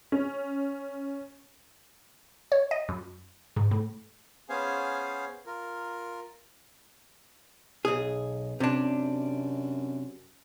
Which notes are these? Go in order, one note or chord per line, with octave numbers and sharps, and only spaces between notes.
C#4
C#5
D#5
F#2
G#2
A2
B3 C#4 G#4 C5 F5 G#5
F4 A#4
B1 G#4
F#2 C3 D4